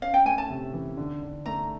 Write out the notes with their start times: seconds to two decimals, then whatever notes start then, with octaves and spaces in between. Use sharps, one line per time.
0.02 C#4 F5
0.14 G5
0.25 A3 G#5
0.38 A5
0.50 C3
0.74 E3
0.97 D3
1.22 D3
1.46 A3 A#5